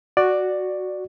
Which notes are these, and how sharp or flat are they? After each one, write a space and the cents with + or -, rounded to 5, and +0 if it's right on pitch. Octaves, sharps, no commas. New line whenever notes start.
F#4 +0 D5 +10